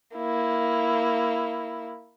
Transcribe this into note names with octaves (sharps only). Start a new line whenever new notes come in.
A#3 E4